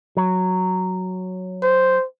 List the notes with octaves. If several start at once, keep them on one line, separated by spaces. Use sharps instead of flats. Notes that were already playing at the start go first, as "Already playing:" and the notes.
F#3
C5